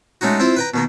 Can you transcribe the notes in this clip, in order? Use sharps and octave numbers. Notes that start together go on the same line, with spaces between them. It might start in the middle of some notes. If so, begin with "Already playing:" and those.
G#3 A3 C#4 D#4 F#4
C4 E4 F4 C5
B4 G5 A#5
B2 D#3 A#3